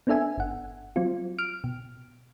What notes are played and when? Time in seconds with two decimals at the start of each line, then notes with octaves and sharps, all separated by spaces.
0.07 B3 C4 D4 A4 E5 G#5
0.38 G1 F#5
0.96 F#3 C4 F4
1.39 F6 D7
1.64 B2